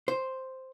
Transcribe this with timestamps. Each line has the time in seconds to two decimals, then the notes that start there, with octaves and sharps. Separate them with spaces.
0.08 C5